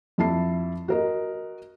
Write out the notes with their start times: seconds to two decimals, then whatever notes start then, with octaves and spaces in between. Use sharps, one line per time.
0.18 F2 E4 A5 C7
0.88 F#4 A#4 D#5